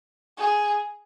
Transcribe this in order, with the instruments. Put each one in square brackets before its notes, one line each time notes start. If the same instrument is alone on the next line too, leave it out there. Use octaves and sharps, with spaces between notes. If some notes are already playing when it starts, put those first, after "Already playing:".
[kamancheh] G#4